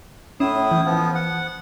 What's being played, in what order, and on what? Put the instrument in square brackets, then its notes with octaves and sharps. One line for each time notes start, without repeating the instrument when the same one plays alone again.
[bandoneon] A2 E4 D#6 [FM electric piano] C#4
[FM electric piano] E3
[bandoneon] F3 B3
F#5